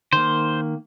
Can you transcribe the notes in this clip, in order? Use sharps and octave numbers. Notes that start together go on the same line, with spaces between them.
D#3 A#3 C5